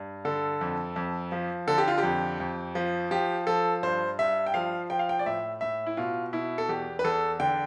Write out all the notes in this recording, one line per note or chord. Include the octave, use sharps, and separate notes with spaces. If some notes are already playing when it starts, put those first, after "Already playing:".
Already playing: G2
D3 A4
F2
F2
F3
D3 A4
G4
F4
G4
F2
F2
F3
F3 G4
F3 A4
G2 C5
G2 E5
G5
F3 F5
F3 G5
F5
G5
D5
A2 E5
A2 E5
E4
B2 F4
B2 E4
A4
E2 G4
B4
E2 A4
D3 G5